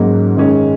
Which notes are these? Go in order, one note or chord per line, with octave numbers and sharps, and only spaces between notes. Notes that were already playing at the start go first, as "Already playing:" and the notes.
Already playing: G#2 F#3 A#3 C#4
F#2 D#3 G#3 C#4